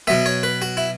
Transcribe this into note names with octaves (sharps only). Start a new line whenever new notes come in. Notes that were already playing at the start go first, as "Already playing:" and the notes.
B2 F#3 B3 E5
C#5
B4
F#4
E4